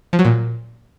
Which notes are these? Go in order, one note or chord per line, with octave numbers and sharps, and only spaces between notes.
F3
F#3
A#2